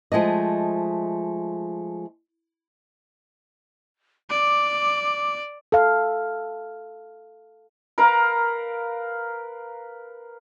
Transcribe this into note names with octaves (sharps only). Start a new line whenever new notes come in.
F3 G#3 A3 D#5
D5 D6
A4 F5
A#4 B4 F5 A#5